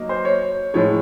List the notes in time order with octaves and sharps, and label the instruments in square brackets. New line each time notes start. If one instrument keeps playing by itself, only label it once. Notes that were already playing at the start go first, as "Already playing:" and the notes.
Already playing: [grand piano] F#3 A#3 D#4
C5
C#5
A2 F3 G#3 C#5